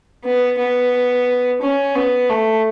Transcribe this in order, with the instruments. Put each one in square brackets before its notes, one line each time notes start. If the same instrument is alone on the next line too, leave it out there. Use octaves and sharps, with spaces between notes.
[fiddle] B3
B3
C#4
B3
A3